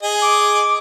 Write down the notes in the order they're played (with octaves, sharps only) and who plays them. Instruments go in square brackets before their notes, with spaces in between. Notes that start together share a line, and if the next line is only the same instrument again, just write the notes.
[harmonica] G#4 D#5
[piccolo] D6